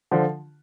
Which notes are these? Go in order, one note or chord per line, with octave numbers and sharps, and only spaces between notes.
D3 F3